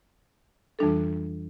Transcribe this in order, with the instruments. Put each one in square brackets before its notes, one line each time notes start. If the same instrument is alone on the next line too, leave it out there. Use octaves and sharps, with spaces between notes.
[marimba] F2 E3 G3 D4 A4